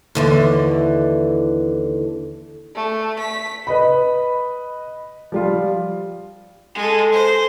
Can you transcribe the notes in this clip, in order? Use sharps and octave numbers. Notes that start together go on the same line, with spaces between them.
D#2 D3 E3
A3
B6
B4 D#5 B5
F3 G3 F4
G#3 A4
C5